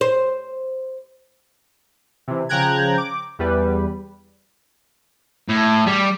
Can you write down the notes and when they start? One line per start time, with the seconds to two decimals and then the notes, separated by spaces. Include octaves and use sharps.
0.01 C5
2.28 C3 E3
2.49 C#3 F3 G5 A#5 F#6 G#6
2.98 D6
3.39 E2 G3 B4
5.48 A2
5.87 G3